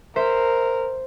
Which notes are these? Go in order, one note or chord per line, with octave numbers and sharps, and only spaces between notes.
A#4 C5 E5